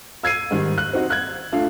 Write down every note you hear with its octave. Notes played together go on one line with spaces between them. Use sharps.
E6 G#6 C7 D#7
G#2 D#3 G3
F#6
C4 D#4 F#4
F#6 G#6
A3 D4 F4 F5